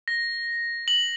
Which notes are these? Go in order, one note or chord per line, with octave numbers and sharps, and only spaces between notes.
A#6
F#7